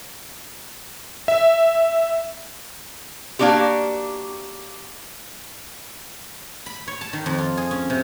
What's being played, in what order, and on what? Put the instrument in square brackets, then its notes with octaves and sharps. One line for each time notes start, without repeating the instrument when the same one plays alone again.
[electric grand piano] E5
[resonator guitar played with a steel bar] A#3 C#4 D4 F#4 G4
[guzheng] B5
C#5
A5
D#3
F2
F4
G#4
C#4
C3